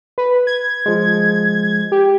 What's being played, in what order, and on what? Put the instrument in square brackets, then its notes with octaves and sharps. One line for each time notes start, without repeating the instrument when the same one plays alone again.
[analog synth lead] B4
G#6
[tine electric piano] F3 G#3
[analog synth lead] G4